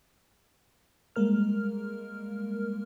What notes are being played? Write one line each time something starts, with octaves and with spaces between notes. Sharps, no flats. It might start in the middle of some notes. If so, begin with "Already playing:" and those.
G3 G#3 A#3 A#4 F6